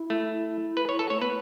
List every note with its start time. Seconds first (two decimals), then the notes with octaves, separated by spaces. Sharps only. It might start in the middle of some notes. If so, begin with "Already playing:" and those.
Already playing: E4
0.10 A3
0.33 E4
0.77 B4
0.89 C#5
0.99 A4
1.10 A3 C#5
1.21 B3 B4